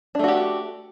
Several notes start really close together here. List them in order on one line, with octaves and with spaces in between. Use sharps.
D4 A3 F#4 G4